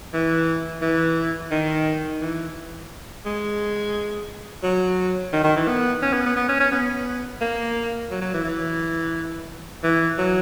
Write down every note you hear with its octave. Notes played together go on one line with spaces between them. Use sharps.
E3
E3
D#3
E3
G#3
F#3
D#3
D#3
E3
B3
C#4
B3
B3
B3
C#4
C#4
B3
A#3
F#3
F#3
E3
E3
E3
F#3